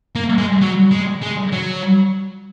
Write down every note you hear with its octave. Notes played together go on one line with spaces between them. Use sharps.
A#3
G#3
F#3
G#3
G#3
F#3